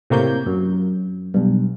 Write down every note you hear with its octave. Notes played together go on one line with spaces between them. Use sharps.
A2 C3 A#3 C#5 G6
F#2
B1 G2